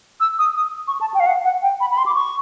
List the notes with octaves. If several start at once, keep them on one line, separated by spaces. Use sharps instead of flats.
E6
D#6
D#6
C#6
A5
G5
F5
F#5
F#5
G5
B5
B5
C6
D6
C#6